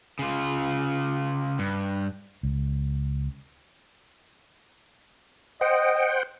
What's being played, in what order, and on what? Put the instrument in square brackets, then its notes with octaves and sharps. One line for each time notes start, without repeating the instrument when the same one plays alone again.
[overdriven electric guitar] C#3 F4
G2
[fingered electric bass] C#2
[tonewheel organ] C5 F#5 G5 [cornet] D#5